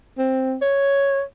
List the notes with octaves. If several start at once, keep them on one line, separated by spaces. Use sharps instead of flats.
C4
C#5